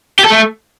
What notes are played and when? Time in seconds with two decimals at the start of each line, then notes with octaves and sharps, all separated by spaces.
0.19 G4
0.24 A4
0.30 A3